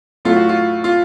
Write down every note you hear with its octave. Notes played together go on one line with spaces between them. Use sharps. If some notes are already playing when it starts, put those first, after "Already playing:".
A2 F#3 A3 F4
F#4
F4
F4